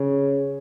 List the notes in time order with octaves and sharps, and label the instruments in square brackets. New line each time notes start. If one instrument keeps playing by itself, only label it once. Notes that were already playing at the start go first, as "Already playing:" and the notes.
Already playing: [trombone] C#3